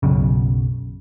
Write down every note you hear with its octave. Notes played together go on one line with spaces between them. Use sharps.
B1 F#2 C#3